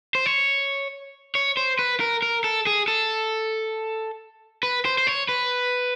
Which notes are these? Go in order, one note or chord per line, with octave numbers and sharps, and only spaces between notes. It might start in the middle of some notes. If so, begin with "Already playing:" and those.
C5
C#5
C#5
C5
B4
A#4
A#4
A4
G#4
A4
B4
C5
C5
C#5
B4